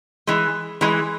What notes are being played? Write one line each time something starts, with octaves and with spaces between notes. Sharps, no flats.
E3 G#3
E3 G#3